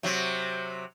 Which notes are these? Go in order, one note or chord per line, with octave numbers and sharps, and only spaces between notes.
C3 F#3